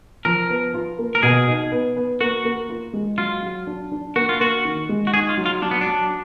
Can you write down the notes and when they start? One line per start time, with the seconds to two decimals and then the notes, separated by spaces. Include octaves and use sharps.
0.25 F3 A#4
0.50 B3
0.74 F4
0.99 A#3
1.15 A#4
1.23 B2 G#4
1.48 D#4
1.72 B3
1.96 B3
2.21 A#3 F#4
2.45 A#3
2.69 F4
2.94 G#3
3.18 F#3 F4
3.43 F#3
3.67 D4
3.91 D4
4.16 A#3 F#4
4.29 F4
4.40 A#3 F#4
4.65 D#3
4.89 G#3
5.07 F#4
5.13 D#4 G#4
5.29 F4
5.37 F#3
5.46 F4
5.62 F#3 D4
5.71 B3
5.81 D4
5.86 F#3